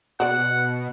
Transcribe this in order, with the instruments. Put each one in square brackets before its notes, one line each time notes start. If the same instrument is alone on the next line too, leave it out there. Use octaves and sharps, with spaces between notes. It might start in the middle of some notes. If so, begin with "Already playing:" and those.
[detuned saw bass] B2 [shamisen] F#4 D5 [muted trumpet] F#5